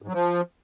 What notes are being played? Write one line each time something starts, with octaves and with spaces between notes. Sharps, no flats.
G#2
F#3
F3